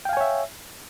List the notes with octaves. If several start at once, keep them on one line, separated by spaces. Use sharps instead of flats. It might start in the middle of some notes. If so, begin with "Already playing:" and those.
C#5 E5 F5 G5 G#5